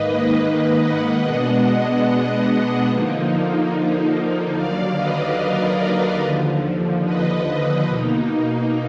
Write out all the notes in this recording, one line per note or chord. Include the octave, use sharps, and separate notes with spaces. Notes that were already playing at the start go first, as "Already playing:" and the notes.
Already playing: G#2 D#3 A#3 B4 D#5
B4 D#5
D#5 F#5
B2 G#3 B3 D4 D#5 F#5
D3 F3 A#3 D#4
D#2 D3 F#3 D5 F5
B4 D#5
A#4 D5
D#2 D3 F3
B4 D#5
B2 A#3 D#4